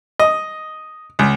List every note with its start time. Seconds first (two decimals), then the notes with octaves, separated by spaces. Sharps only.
0.20 D#5
1.19 C#2